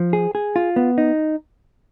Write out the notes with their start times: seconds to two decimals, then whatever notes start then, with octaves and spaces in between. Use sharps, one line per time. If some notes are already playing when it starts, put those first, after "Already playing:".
Already playing: F3
0.13 G#4
0.35 G#4
0.56 F4
0.76 B3
0.98 D#4